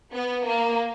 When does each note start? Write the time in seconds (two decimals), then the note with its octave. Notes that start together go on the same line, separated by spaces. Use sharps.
0.12 B3
0.46 A#3